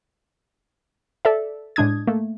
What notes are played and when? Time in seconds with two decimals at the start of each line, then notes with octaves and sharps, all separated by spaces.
1.25 A4 D5 E5
1.76 A2 G#3 D4 D#6 G#6
2.07 A3 A#3